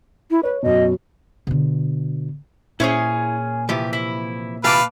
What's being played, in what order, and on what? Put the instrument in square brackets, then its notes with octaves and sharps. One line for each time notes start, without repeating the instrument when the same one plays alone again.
[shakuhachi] E4
[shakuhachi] B4 [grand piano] C#5
[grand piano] F#2 B2 [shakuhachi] D#5
[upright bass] B2 D3
[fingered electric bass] A#2 [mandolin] C#4 G#4 [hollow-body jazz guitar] E4 C5 C#5
[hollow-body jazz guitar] C3 E3 F3 [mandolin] G4
[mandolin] E4
[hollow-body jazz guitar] C3 E3 F4 [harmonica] B4 F5 [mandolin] A5 D6